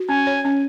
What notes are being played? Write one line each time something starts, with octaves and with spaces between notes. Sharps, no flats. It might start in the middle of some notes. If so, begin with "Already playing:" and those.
Already playing: F#4
C#4 G#5
C#5
C#4